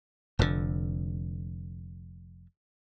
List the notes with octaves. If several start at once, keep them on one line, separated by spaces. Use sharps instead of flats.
F1 F2 A2 D3